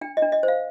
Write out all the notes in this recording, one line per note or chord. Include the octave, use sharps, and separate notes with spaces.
D4 G5
D#5
D4
D#5
C5
F5